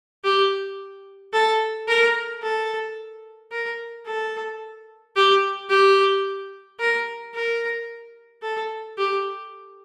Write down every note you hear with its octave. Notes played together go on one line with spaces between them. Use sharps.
G4
A4
A#4
A4
A#4
A4
G4
G4
A#4
A#4
A4
G4